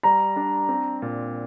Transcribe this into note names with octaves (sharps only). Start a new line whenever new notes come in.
G3 A#5
D4
C4
A#2